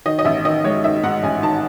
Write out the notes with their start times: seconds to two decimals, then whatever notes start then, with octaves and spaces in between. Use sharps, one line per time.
0.06 D#3 D#5
0.19 D#5
0.25 A1 E5
0.45 D#3 D#5
0.64 G#3 C#5
0.84 D#3 E5
1.03 G#2 F#5
1.23 A1 G#5
1.43 D#3 A5